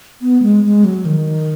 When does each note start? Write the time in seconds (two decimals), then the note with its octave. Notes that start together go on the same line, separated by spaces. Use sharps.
0.22 B3
0.42 G#3
0.64 G#3
0.84 F#3
1.05 D#3